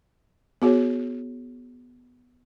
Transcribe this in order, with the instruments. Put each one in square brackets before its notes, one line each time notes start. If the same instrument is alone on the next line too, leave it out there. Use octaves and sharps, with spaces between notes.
[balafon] B3 F#4 G#4 C#5